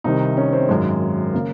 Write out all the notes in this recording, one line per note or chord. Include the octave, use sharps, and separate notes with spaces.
C2 C3 D#3 D#4
C#4
C4
G#1 F#2 D#3 G#3
C#3 A#3